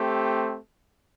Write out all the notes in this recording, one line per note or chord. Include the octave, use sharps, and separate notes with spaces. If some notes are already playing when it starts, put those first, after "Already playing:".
Already playing: A3 C4 G4